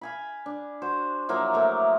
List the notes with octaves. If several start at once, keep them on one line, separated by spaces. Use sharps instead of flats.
F5 G#5 B5
D4
F#4 C5
F3 F#3 A#3 E4
A3 A#3